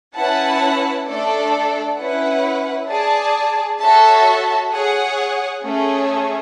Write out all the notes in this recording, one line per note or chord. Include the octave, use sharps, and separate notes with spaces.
C#4 E4 B4 F#5 A5
A3 D4 A4 D5
C#4 E4 B4 F#5
G#4 D5 A5
F#4 A4 C#5 E5 A5
G#4 C#5 F#5
A3 C#4 G#4 C#5